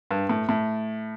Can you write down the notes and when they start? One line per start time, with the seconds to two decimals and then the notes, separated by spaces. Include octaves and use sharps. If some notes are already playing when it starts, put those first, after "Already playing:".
0.11 G2
0.29 A2
0.49 A2